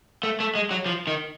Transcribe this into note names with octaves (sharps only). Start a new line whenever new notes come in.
A3
A3
G#3
F#3
F3
D#3